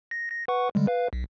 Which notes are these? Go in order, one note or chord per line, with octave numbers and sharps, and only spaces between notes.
A#6
A#6
B4 F#5 C#6
D3 G3 G#3
B4 F5
B1